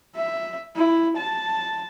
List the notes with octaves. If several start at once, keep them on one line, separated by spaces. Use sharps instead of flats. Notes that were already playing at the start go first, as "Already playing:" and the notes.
E5
E4
A5